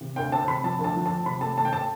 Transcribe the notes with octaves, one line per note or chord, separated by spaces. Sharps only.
C3
D2 G5
C4 A5
C3 B5
F3 A5
D2
A5
F3
C4 A5
C3 B5
A3 A5
A3 A5
G5
A5